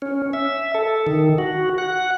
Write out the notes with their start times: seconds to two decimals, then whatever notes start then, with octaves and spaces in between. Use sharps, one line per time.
0.02 C#4
0.33 E5
0.75 A4
1.07 D#3
1.38 F#4
1.78 F#5